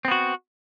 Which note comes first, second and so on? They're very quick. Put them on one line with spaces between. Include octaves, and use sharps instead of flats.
C4 B3 F#4